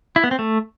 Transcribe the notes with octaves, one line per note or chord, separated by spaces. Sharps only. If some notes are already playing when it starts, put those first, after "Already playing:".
E4
B3
C4
A3